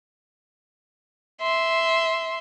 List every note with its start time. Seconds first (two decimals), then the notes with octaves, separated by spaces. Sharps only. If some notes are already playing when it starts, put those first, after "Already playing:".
1.42 E5 C6